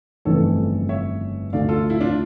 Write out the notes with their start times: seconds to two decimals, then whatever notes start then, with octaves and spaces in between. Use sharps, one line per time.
0.25 G1 F2 C#3 E3 A3 A4 C#5
0.89 C#5 E5
1.53 D2 D3 A3 D5 F5
1.69 F4 A4
1.90 E4
2.01 D4 F4